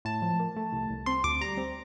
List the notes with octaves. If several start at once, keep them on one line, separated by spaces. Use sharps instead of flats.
A2 A5
F3
A#3
A3
C2
C2
C4 C6
D2 D6
G3 A#5
C4